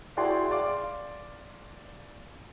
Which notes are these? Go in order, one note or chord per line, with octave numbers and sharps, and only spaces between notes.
E4 F#4 G#4 D5 G5 C6
D5 F5 C6 D6